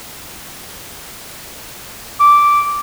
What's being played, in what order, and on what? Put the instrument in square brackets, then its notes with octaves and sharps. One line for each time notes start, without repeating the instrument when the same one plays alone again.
[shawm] D6